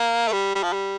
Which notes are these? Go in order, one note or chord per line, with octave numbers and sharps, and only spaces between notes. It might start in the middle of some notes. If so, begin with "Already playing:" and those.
Already playing: A#3
A3
G3
G3
F3
G3